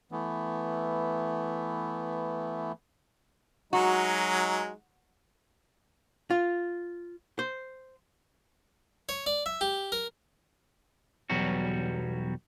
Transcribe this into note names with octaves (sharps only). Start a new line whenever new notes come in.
E3 A3 B3
F#3 G#3 D#4 F#4
F4
C5
C#5
D5
E5
G4
A#4
B1 E2 F#3 G3 F#4